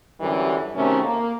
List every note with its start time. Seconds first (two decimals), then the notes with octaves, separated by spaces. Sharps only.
0.20 F#2 D3 E3 G3
0.75 C3 D#3 A3 C#4 F#4 A#4
1.04 A#3